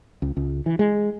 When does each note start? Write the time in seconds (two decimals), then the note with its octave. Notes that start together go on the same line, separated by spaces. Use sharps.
0.22 C#2
0.37 C#2
0.66 E3
0.79 G#3